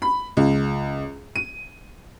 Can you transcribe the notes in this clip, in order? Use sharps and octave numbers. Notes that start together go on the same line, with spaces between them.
B5
C#2
D#7